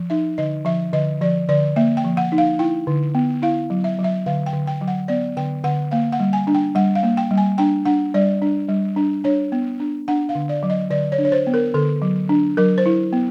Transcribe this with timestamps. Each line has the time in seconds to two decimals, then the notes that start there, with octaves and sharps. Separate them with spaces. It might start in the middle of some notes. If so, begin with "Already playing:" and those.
Already playing: F3
0.10 D#4 E5
0.38 D3 D#5
0.65 F3 E5
0.93 D3 D#5
1.21 F3 D5
1.49 D3 D5
1.76 A#3 E5
1.97 G5
2.05 F3
2.17 F#5
2.32 D#4
2.38 F5
2.59 E4 G5
2.87 D3
3.15 B3
3.42 E4 F5
3.70 F#3
3.84 E5
3.99 F#3
4.04 E5
4.26 D3 F5
4.46 G5
4.53 D3
4.67 G5
4.81 F#3
4.87 F#5
5.08 B3 D5
5.36 D3 G5
5.64 D3 F#5
5.91 A#3 F5
6.12 F#5
6.20 G3
6.33 G#5
6.47 D4
6.55 G5
6.75 G3 F#5
6.95 F5
7.03 A#3
7.17 G5
7.31 G3
7.37 G#5
7.58 D4 G5
7.85 D4 F#5
8.14 G3 D5
8.42 D4
8.69 G3
8.96 D4
9.24 D4 C#5
9.52 B3
9.80 D4
10.08 D4 F#5
10.29 F5
10.35 D3
10.49 D5
10.63 F#3
10.70 D#5
10.90 D3 D5
11.12 C#5
11.18 D4
11.25 C#5
11.32 C5
11.47 B3
11.54 A#4
11.74 D3 A4
12.02 F#3
12.29 D4
12.57 F#3 A#4
12.78 C5
12.86 E4
13.13 B3